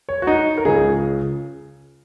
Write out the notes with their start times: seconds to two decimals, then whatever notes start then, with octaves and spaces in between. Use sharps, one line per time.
0.09 C#5
0.22 F#4
0.27 D#4
0.57 A#4
0.65 C#2 C#3 G#4